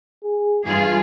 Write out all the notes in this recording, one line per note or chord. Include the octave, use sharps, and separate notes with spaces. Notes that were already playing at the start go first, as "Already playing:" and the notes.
G#4
G2 E3 F4 G#4